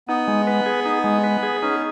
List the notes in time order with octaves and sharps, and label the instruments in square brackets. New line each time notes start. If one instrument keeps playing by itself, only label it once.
[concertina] B3 [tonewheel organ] D#4
[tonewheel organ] G#3
B4
G#4
D#4
G#3
B4
G#4
[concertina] C#4 [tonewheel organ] D#4